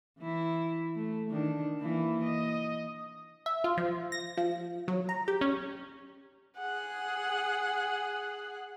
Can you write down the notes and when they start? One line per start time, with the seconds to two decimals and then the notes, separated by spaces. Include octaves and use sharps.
0.19 E3 E4
0.96 A3
1.30 D#3 D4
1.81 E3 A#3 E4
2.23 D#5
3.46 E5
3.64 F4
3.77 F3
4.12 A#6
4.37 F3
4.88 F#3
5.09 A#5
5.28 G4
5.41 C#4
6.58 G#4 F#5